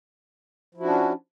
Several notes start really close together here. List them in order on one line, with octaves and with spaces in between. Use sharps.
F3 E4 F#4 D4 C#4